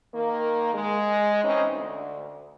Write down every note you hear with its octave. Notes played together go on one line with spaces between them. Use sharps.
D#3 A#3
G#3
E3 C4 C#4 D#4 D#5
D2